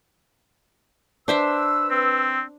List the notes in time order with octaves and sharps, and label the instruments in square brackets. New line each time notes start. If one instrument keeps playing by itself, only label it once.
[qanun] D4 C5 E5 [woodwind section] B4 E6
[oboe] C4